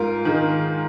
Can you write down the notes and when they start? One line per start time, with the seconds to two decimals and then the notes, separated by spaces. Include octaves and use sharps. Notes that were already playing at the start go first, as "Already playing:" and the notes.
Already playing: G#2 F4 A#4
0.25 D#3 G#3